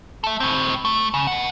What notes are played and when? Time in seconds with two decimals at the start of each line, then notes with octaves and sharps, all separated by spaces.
0.24 A4 E5
0.40 A2 C4
0.85 A3
1.14 C#3
1.27 B2 F#5